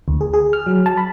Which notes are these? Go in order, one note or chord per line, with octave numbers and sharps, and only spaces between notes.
D2
G#4
G#4
F6
F#3
A5
B5